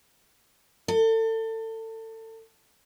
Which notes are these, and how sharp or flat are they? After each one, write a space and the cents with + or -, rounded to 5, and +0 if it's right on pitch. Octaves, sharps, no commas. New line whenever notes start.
A4 +30